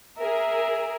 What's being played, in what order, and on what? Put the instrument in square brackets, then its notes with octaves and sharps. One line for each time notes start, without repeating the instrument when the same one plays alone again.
[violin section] G#4 A#4 [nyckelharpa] E5